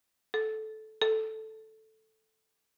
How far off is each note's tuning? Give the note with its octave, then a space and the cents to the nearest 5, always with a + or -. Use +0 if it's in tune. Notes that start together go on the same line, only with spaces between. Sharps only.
A4 -15
A4 +0